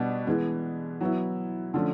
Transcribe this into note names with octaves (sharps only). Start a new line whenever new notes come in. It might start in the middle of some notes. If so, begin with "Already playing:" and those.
Already playing: B2 G3 B3 D4
E3 G#3 B3
F#3 B3 E4
D3 F3 A3 C#4